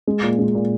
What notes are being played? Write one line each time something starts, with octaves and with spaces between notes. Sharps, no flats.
G#3
A#2
G#3
A#2